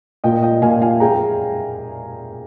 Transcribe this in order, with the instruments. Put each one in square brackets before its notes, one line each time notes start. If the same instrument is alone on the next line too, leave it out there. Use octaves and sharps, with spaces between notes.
[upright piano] A#2 [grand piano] D#5 G5
[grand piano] D#5 G5
[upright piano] A#2 [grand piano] F5 G#5
[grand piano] F5 G#5
[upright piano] G#4 [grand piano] G5 A#5